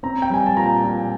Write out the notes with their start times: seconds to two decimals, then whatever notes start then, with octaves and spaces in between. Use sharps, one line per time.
0.03 C4 A#5
0.22 G5
0.30 G3 G#5
0.46 A5
0.57 A#2 A#5
0.84 A#2